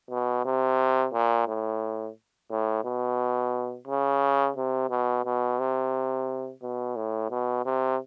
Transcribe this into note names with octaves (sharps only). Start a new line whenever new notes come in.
B2
C3
A#2
A2
A2
B2
C#3
C3
B2
B2
C3
B2
A2
B2
C3